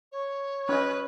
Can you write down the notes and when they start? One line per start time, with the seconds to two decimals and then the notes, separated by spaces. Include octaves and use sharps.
0.12 C#5
0.69 C#4 B4 D#5